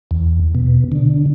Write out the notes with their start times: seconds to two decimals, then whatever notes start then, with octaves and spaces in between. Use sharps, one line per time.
0.11 E2
0.55 B2
0.92 D3